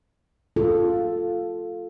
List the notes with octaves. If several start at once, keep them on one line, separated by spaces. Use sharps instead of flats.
F4 A4